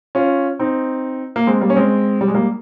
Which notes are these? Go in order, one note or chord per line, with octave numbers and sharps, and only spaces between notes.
C#4 F4
C4 D#4
A#3
G#3 C4
G3 A#3
C#4
G#3 C4
G3
G#3
G3 A#3